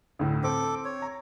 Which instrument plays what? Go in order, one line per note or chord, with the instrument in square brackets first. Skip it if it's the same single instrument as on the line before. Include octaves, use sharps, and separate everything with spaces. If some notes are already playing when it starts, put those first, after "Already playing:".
[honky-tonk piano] D2 A2
[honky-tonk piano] C4 [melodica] A4 D6
[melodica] C#5
[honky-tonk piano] A#5